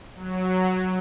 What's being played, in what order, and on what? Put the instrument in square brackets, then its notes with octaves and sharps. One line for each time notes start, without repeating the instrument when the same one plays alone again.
[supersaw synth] F#3